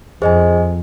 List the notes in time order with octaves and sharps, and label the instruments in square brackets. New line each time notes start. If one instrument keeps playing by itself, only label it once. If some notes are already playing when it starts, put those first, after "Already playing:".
[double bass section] F2 [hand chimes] G#4 C5 D#5 G#5